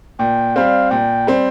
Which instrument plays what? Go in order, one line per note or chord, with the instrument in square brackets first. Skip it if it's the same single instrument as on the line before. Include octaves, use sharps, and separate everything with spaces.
[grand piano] A#2 [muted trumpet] G5
[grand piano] G3 C4 [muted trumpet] F5
[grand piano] A#2 [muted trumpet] G5
[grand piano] G3 C4